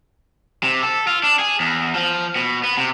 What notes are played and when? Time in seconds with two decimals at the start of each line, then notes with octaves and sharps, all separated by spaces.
0.63 C3
0.82 A4
1.07 F4
1.23 D4
1.39 G#4
1.60 E2
1.95 F3
2.36 B2
2.63 B3
2.77 C3